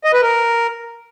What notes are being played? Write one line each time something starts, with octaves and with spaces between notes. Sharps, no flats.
D#5
B4
A#4